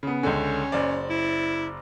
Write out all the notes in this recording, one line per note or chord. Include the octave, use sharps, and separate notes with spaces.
C#3 B3
C#2 D3 C#4
F#1 C5 D5
E4